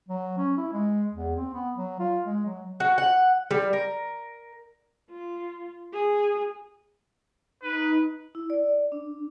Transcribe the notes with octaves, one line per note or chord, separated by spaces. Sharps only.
F#3
C#4
E4
G#3
E2
C4
B3
F#3
F4
G#3
F#3
F#4
F#5
G3
A#4
F4
G#4
D#4 B4
E4
D5
D4